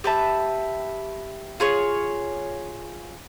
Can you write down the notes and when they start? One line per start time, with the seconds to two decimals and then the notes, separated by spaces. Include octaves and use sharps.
0.04 G4 B4 E5 A5
1.60 F4 G#4 C#5